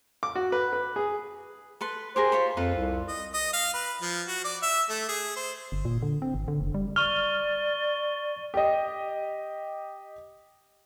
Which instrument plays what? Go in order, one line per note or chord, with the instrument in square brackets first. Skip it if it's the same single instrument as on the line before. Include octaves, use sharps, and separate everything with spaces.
[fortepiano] D6
F#4
B4
B4
G#4
[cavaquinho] A4 B4 C6
[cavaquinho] G4 G#4 A#4 [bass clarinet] C5
[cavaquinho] F4 C#5 B5
[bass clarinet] F2 [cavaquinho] F4 A4 B4
[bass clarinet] C2
[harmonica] D#5
D#5
F5
B4
F3
F#4
D5
E5
A3
G#4
C5
[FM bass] G1
A#2
D3
C4
G#1
D3
F#1
G3
[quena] D5 [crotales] C#6 G7 [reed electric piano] F6
[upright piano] G4 D#5